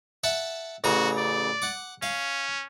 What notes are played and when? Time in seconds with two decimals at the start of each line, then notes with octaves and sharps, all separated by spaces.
0.24 E5 F#5 A5
0.84 A1 C#3 F#4 A#5
1.18 D5
1.62 F#5 D6
2.03 C#4 F5